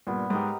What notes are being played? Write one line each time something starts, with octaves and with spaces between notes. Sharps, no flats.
G2 A#2 B3
G#2 G4 A#4 D#5